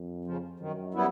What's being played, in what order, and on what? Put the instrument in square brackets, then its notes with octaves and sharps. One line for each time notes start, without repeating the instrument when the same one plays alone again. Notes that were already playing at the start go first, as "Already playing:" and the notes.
Already playing: [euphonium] F2
[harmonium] C#3 F3
[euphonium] F#2 [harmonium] D#3
[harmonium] G3 B3 E4